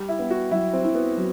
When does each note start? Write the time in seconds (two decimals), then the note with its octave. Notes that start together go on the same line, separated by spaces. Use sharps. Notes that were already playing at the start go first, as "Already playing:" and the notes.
Already playing: G3
0.09 E4
0.19 B3
0.30 F#4
0.51 F#3 E4
0.73 C4
0.84 E4
0.95 B3
1.17 F#3